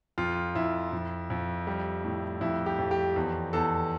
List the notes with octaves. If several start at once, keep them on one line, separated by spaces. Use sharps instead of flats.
F2 F4
F2 E4
F2
F2
G3
A2
F2 E4
G4
F2
G4
E2
E2 A4